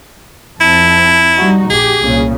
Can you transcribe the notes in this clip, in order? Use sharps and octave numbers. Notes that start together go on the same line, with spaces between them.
F2 C4 E4 A5
G3 D#4 F#4
A#1 G4 G#4
C2 A#2 C#3